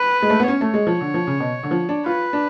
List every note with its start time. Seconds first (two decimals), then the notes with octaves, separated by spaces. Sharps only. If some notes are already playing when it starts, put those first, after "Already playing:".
Already playing: B4
0.22 G#3
0.30 A3
0.40 B3
0.48 C#4 C#5
0.61 A3
0.74 G#3
0.87 F3
1.01 D3
1.14 F3
1.27 C#3
1.40 B2
1.63 D3
1.71 F3
1.89 D4
2.06 F4 B4
2.33 D4